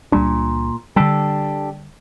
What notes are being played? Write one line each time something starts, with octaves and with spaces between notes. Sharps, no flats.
C#2 A#2 G3 D4
D3 G3 D4 G4 A4